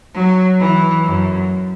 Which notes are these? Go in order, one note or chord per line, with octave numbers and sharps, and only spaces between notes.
F#3
E3
F#2